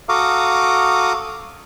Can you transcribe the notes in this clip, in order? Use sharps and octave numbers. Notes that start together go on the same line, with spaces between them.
F#4 A4 F5 A#5 D6 D#6